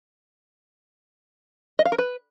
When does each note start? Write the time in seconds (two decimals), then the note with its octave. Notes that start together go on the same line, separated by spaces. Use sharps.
1.79 D#5
1.85 F5
1.92 A#4
1.98 B4